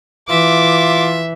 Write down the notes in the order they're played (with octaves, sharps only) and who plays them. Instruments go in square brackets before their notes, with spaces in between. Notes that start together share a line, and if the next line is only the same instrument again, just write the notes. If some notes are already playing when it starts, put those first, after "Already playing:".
[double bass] E3 [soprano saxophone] F4 [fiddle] E5 [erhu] D6